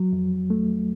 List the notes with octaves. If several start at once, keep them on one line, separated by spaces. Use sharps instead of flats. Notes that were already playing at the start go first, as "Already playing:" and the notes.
Already playing: F#3
F2
A3